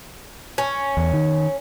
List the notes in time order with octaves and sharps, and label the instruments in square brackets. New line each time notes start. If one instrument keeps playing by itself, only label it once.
[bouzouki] C#4
[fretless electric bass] E2
D#3